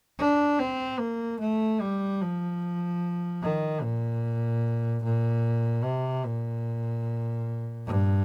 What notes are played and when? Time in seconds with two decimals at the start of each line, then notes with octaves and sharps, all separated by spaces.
0.19 D4
0.59 C4
0.99 A#3
1.40 A3
1.81 G3
2.21 F3
3.42 D#3
3.82 A#2
5.03 A#2
5.84 C3
6.25 A#2
7.86 G2